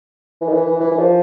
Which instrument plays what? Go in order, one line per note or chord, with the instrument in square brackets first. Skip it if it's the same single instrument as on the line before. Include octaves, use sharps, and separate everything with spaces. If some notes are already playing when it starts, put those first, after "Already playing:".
[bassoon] E3
D#3
E3
E3
E3
E3
F3